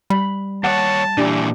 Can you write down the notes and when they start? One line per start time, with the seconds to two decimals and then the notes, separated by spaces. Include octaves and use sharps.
0.10 G3 B5
0.64 D#2 C#5 F#5 A5
1.18 A#2 E3 D4 G4